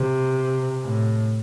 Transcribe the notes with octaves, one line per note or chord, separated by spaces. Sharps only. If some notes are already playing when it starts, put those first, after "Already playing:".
Already playing: C3
A2